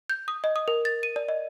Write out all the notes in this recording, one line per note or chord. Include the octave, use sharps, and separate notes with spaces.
G6
D#6
D#5
D#6
A#4
A6
D#7
D5
D#5